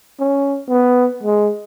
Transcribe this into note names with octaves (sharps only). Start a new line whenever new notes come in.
C#4
B3
G#3